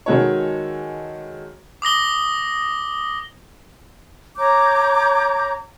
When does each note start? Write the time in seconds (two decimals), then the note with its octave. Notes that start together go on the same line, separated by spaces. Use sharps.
0.06 D#3 G#3 F#4 A4 C#5
1.82 D6 D#6 A#6 G7
4.37 C#5 A#5 D6 G6